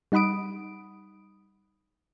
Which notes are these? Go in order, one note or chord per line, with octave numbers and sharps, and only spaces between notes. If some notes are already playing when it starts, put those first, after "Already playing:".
G3 D#4 F#5 B5 D#6 D7